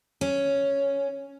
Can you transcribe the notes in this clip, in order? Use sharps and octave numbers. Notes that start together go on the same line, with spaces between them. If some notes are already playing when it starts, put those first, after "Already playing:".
C#4